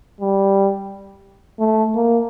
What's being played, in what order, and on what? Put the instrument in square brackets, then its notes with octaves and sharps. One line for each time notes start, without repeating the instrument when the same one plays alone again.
[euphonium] G3
A3
A#3